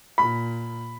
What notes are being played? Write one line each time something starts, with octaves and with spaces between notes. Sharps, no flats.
A#2 B5